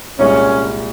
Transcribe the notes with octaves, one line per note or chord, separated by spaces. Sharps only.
C2 A#2 G#3 C#4